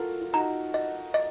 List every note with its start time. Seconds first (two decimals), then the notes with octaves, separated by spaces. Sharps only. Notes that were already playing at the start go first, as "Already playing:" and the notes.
Already playing: F4 F#4 A4 A#4
0.21 F4
0.33 D#4 F#4 A#5
0.74 D#5
1.14 D#5